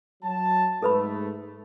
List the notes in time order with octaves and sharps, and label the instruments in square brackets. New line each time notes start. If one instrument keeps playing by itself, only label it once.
[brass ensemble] F#3 A5
[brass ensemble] G#2 A3 [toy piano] A4 B4 B5